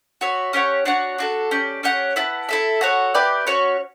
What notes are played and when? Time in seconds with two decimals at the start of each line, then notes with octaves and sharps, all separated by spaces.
0.21 F#4 C#5 E5
0.53 C#4 G4 C#5 F#5
0.85 D4 F#4 C#5 F#5
1.18 D4 F#4 A4
1.51 C#4 G4 D5
1.83 C#4 G4 C#5 F#5
2.16 E4 B4 F#5 A5
2.49 E4 A4 E5
2.81 F#4 A4 C#5 F#5
3.14 E4 G4 B4 D5
3.47 C#4 F#4 C#5